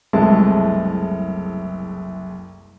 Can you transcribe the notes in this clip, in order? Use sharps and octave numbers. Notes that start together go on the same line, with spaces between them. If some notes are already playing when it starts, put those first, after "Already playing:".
F#1 C2 G#3 A3 A5